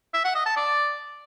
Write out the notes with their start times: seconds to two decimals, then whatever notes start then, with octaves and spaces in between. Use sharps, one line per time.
0.13 E5
0.24 F#5
0.35 D#5
0.46 A5
0.57 D5